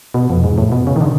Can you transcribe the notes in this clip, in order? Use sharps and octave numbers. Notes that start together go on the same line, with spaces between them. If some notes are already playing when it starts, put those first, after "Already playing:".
B2
F2
G#2
A2
B2
C#3
D#3
D3